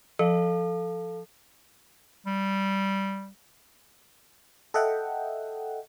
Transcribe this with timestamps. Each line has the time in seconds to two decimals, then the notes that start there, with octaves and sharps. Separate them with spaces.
0.19 F3 A4 F5
2.27 G3
4.74 A4 D#5 E5 F#5 G5